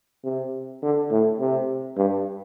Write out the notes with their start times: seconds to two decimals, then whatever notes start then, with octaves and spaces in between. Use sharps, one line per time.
0.24 C3
0.82 D3
1.11 A2
1.40 C3
1.97 G2